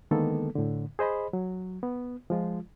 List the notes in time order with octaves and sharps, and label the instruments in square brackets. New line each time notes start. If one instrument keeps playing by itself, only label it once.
[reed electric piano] D3 D#3 G#3 A#3 B3 A4
A2 D3
G#4 C5 D#5 B5
F#3
B3
F3 G#3 F4